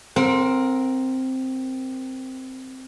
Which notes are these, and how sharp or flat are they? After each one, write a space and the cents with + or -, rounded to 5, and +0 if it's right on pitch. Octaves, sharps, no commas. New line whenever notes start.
C4 +0 A#4 +0 F#5 -45